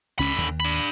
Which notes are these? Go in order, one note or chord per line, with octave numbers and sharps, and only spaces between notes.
C#2 D3 C#4 B5
D#2
D4 B5